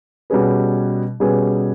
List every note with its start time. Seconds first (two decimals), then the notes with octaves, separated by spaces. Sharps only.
0.30 B2 G3 C#4 G#4 B4
1.20 B2 G3 C#4 G#4 B4